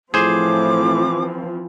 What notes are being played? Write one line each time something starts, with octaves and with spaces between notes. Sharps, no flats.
A2 E3 F3 C4 G#4 C5 D6